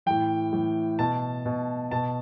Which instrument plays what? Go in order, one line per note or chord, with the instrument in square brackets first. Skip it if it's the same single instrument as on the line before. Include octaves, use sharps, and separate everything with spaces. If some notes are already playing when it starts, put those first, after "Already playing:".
[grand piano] A2 E3 G5
A2 E3
B2 A5
B2
B2 A5